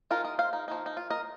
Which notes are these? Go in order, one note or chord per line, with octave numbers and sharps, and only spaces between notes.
F3 G#3 D#4 F4 A#4
A#4 D#5
C5 F5
D#4
F3 A#3 D#4
D#4
F4
A#4 D#5